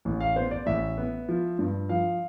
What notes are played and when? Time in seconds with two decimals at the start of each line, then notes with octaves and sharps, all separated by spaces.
0.05 A1
0.20 F5
0.36 B3 C5
0.51 D5
0.66 A1 E5
0.97 B3
1.29 F3
1.59 G2
1.89 F3 F5